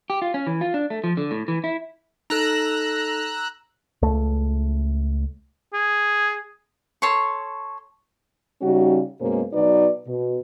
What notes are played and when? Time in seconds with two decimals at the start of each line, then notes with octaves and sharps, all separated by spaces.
0.10 G4
0.22 F4
0.34 C#4
0.47 E3
0.61 F4
0.74 D4
0.90 A3
1.04 F3
1.17 D3
1.31 A2
1.48 E3
1.64 E4
2.30 D#4 A4 A#5 E6 F#6
4.02 C#2 A3
5.73 G#4
7.02 A4 C#5 C6 C#6
8.62 C#3 G3 C#4 D#4 F#4
9.20 F#2 B2 G#3 A#3 C#4 C5
9.53 B2 F#3 D#4 F#4 B4 D5
10.06 B2